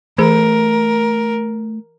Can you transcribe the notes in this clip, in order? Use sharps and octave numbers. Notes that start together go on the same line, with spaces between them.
E3 A3 G#4 A#4